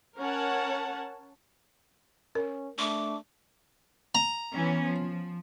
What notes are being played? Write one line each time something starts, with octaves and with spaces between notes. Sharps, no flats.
C#4 A#4 C#5 F#5 A5
C#4 A#4
A3 D4 D6
A#5
E3 B3 C#4
F3